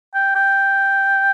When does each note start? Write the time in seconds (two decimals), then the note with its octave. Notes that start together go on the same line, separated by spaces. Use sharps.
0.14 G5
0.35 G5